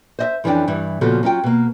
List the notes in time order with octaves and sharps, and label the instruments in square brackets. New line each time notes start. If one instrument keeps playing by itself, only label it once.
[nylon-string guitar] C5 D#5 E5
F2 E3 C#4 D4 G5
G2 E3 E4
A#2 C#3 F3 B3 F#4 A4
F#3 C#4 F4 G5
B2 A#3